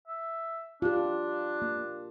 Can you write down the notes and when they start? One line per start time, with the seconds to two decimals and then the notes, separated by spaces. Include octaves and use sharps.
0.07 E5
0.82 D4 F4 G4
1.62 A#3